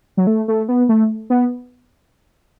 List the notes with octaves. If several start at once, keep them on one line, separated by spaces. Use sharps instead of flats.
F#3
A3
A3
B3
A3
B3